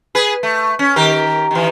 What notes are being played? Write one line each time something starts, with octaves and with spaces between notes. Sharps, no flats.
G#4 B4
A3
C#4
D#3 G4 A#4
D#3 E3